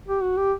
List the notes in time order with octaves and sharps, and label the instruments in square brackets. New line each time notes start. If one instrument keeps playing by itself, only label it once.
[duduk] G4
F#4
G4